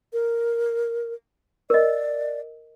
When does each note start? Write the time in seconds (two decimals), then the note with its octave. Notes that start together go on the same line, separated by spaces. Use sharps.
0.13 A#4
1.70 A#4 D5 D#5